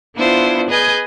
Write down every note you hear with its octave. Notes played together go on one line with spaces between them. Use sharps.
B3 D4 E4 F4 C5
G#4 B4 D#5 G#5 G6